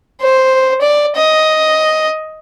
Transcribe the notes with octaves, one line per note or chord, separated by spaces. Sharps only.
C5
D5
D#5